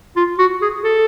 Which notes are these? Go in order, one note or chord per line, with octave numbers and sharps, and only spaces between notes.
F4
F#4
G#4
A4